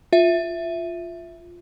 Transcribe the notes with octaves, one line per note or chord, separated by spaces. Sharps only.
F4 E5